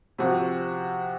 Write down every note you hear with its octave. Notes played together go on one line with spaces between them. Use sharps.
C3 F3 C4 F#4